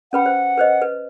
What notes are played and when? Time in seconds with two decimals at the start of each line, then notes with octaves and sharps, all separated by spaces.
0.13 C#4 B4 F#5 B5
0.26 C5
0.57 B4 C5 D#5
0.82 B4